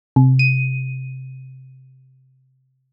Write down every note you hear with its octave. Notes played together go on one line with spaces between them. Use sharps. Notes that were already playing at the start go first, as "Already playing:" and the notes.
C3
D#7